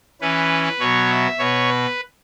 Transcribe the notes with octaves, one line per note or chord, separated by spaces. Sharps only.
E3 C#4 B4
B2 F#3 B3 C#5
E5
B2 B3 C#5
B4